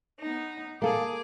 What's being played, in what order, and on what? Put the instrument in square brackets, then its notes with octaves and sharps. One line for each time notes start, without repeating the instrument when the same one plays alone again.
[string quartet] B3 D#4
[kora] A#3 A4 [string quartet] G#4 D6